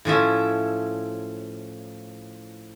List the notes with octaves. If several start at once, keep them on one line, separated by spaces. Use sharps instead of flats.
A2 F3 C#4 E5